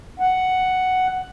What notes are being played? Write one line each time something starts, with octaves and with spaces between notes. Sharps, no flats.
F#5